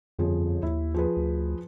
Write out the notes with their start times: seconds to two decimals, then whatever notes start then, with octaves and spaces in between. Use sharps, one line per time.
0.19 G1 F2 F3 G#4
0.63 D#2 E4
0.94 F3 G#4 B4
1.17 D2